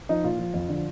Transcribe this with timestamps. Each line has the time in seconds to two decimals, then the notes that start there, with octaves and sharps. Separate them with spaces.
0.09 F3 D#4
0.24 A#2 F4
0.39 F3
0.54 F2
0.69 D3 F3